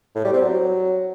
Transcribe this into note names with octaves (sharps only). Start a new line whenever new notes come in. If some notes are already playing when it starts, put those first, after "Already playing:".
A2
G3
C4
F#3